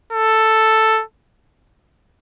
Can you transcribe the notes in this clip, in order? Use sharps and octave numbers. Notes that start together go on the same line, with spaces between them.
A4